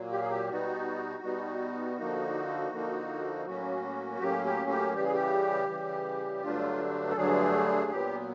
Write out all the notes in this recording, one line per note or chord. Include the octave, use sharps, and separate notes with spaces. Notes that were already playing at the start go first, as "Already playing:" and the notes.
Already playing: A#2 F#3 A#3
G4
G#4
G4
B2 G3 B3 D#4 F#4
B2 G3 B3 D#4
D3 F3 A#3 D#4
D3 F3 A#3 D#4
A2 F#3 A#3 C#4 F#4
A2 F#3 A#3 C#4 G4
G4
G4
C#3 E3 G3 G4
G#4
G4
C#3 E3 G3
G2 D3 F#3 A3 D4 F4
A4
G2 D3 F#3 A3 D4 G#4
A#2 F#3 B3 G4